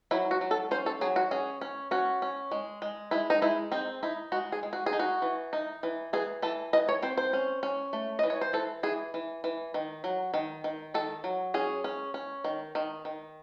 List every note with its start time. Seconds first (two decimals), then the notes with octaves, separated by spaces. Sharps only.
0.11 F#3 E4
0.31 F#4
0.41 F#3
0.51 A4
0.71 C#4 C5
0.86 A4
1.01 F#3 G#4
1.16 F#4
1.31 C#4 G#4
1.61 C#4
1.91 C#4 F#4
2.22 C#4
2.51 G#3
2.82 G#3
3.11 G#3 E4
3.30 D#4
3.42 G#3 E4
3.72 C4 D#4
4.03 D#4 E4
4.32 G#3 F#4
4.52 G#4
4.63 G#3
4.73 F#4
4.86 G#4
4.93 D#4
4.99 F#4
5.22 E3
5.53 D#4
5.83 E3
6.13 E3 G#4
6.42 E3 A4
6.73 E3 D#5
6.89 C#5
7.02 C4 C5
7.17 C5
7.33 C#4
7.63 C#4
7.93 A3
8.19 E3 D#5
8.30 C#5
8.41 C5
8.53 E3 A4
8.83 E3 G#4
9.14 E3
9.44 E3
9.74 D#3
10.04 F#3
10.34 D#3
10.64 D#3
10.94 D#3 A4
11.24 F#3
11.54 C#4 G#4
11.84 C#4
12.14 C#4
12.44 D#3
12.75 D#3
13.05 D#3